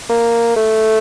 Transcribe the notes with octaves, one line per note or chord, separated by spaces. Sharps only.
A#3
A3